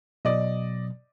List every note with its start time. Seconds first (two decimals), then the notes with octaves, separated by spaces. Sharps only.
0.25 B2 F#3 D5 D#5